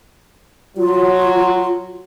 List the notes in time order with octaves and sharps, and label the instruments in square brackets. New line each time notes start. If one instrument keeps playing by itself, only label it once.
[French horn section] F#3 [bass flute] F4